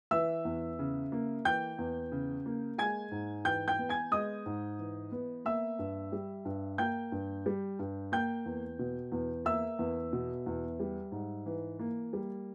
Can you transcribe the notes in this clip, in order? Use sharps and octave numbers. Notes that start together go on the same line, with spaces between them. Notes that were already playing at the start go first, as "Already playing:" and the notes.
E3 E5 E6
E2
C#3
A#3
E3 G5 G6
E2
C#3
A#3
G#3 G#5 G#6
G#2
E3 G5 G6
G5 G6
B3
G#5 G#6
G#3 D#5 D#6
G#2
E3
B3
A#3 E5 E6
G2
G3
G2
A#3 G5 G6
G2
G3
G2
A#3 G5 G6
E2
B2
E2
A#3 E5 E6
E2
B2
E2
G3
G#2
E3
A#3
G3